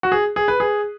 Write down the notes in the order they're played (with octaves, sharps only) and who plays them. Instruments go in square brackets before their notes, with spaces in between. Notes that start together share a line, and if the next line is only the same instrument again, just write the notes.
[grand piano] F#4
G#4
G#4
B4
G#4